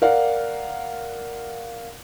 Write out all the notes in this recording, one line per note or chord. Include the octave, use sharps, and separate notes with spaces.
A#4 D5 F5 F#5